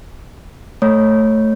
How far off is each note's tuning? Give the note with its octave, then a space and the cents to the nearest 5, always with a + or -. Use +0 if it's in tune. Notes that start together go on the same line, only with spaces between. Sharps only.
A3 +0 C#5 -10